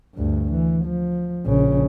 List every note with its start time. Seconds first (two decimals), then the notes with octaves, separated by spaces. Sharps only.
0.15 D2 G2
0.52 E3
0.85 F3
1.46 A#1 C#3